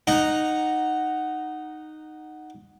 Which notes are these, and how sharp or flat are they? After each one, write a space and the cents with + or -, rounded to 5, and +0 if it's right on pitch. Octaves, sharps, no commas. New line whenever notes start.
D#4 -10 F#5 +0 A#5 +0